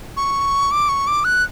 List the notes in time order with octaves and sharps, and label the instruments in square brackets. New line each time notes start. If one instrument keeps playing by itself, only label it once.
[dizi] C#6
D6
C#6
D6
F#6